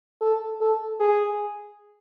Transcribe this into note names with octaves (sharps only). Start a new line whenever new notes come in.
A4
A4
G#4